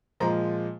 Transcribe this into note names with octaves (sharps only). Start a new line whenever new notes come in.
A#2 F3 G#3 A#5